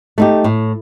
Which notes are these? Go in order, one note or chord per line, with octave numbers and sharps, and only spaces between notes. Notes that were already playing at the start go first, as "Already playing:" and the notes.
A3 D#4 G4
A2